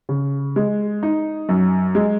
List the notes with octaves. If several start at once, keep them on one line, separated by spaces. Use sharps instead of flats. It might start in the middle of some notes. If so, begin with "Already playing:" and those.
C#3
G#3
D#4
F#2
G#3